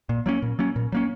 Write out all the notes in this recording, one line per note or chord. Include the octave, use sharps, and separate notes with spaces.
A#2
F#3 A#3 C#4
A#2
F#3 A#3 C#4
A#2
F#3 A#3 C#4